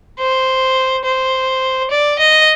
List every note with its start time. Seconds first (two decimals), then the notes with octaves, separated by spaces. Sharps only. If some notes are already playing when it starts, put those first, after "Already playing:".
0.19 C5
1.05 C5
1.91 D5
2.19 D#5